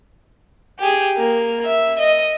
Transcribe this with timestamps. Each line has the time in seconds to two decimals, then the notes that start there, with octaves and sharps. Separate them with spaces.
0.79 G4 G#4
1.17 A#3
1.66 E5
1.99 D#5